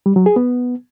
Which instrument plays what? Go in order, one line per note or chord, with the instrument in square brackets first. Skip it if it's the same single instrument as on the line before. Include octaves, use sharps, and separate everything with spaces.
[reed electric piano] G3
F#3
G#4
B3